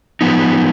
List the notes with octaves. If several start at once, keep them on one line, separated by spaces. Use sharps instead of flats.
F3 B3 D#4